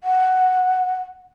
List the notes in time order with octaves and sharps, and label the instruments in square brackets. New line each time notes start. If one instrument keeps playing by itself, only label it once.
[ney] F#5